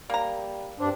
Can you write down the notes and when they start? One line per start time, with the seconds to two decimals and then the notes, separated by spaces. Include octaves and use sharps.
0.10 G3 A#3 A#5
0.80 G2 C4 D4